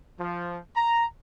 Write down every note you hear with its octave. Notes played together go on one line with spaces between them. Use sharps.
F3
A#5